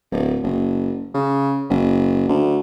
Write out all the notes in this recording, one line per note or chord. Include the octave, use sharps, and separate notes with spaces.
D1
F#1
C#3
F#1
D2